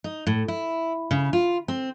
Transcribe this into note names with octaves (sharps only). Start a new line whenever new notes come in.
D#4
A2
E4
C#3
F4
C4